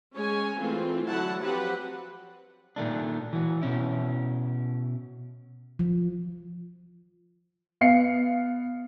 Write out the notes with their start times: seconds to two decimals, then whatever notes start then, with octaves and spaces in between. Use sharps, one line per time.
0.15 G#3 C#4 C#5 G#5
0.59 E3 A3 C4 F4
1.08 D3 F#3 E4 F#4 F#5 A5
1.42 F3 F#3 C4 G4 B4 F#5
2.76 A#2 D#3 A3 D4
3.33 E3 F#4
3.62 B2 C#4 E4
5.79 F3
7.81 B3 F5 C7 C#7